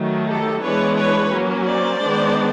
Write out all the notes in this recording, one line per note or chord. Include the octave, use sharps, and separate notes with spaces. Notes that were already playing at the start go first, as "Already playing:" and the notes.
Already playing: D#3 F#3 A3
G4 A4
E3 G#3 B3 D4 B4 C#5
B4 C#5
F#3 A#3 C#4
C5 D5
D#3 G#3 B3 D4